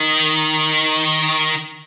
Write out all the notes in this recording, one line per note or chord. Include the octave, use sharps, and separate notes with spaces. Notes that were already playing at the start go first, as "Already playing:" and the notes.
Already playing: D#3